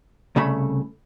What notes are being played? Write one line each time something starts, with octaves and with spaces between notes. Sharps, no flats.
C2 C#3 A3 B5